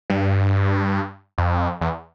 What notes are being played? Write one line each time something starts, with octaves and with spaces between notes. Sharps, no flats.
G2
F2
E2